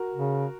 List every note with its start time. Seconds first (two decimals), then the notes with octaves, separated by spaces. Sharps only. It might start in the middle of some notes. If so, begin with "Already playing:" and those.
Already playing: F#4 A#4
0.14 C#3